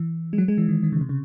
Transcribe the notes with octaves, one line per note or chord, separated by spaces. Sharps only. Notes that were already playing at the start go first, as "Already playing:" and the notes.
Already playing: E3
G#3
F#3
G#3
E3
D#3
D#3
C#3
C3
C#3